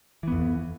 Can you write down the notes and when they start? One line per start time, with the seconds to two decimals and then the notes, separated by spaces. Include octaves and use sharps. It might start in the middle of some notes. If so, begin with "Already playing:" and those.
0.23 E3
0.28 B3
0.32 F2